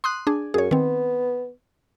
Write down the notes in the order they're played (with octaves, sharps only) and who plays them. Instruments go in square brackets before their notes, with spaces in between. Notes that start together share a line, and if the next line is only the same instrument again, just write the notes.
[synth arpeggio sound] C6 D#6 F#6
D4 G#4
[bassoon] F#2 [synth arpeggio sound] G#4 C#5
[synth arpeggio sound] D#3 C4 [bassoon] B3